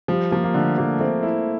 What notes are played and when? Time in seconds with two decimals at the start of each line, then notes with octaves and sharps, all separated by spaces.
0.08 F3 G3
0.31 F3 A#3
0.44 A#3
0.54 D3 A3
0.78 F3 A#3
1.00 A3 C4
1.23 E4